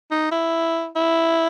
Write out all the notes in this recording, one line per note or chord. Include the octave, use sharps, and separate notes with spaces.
D#4
E4
E4